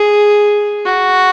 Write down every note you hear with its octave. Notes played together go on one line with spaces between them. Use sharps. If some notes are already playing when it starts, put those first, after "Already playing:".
Already playing: G#4
F#4